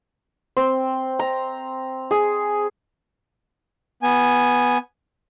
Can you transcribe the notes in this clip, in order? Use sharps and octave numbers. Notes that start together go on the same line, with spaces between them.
C4
A#5
G#4
B3 G#5